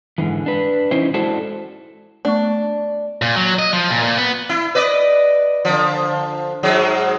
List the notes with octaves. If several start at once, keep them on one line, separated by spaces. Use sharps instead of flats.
G#2 B2 D3 E3
D4 B4
E3 C#4 D#4 E4 C5
G#3 E4 F#4 A4 C5 D5
A3 B3 D4 C#6
A#2
F#3
D#5
F3
A#2
A#2
B3
E4
B4 D5 D#5
D3 F3
G#2 F#3 G#3